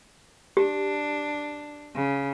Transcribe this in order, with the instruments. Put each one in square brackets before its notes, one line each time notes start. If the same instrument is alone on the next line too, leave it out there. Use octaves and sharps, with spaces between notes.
[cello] D4 [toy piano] G4
[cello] C#3